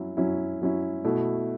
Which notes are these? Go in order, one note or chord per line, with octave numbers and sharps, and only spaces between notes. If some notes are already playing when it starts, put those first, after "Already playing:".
Already playing: F#3 C#4 E4
F#3 C#4 E4
F#3 C#4 E4
B2 A3 E4